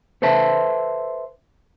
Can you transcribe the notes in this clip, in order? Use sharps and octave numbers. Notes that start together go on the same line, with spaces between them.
A4 B4 C5 E5 A5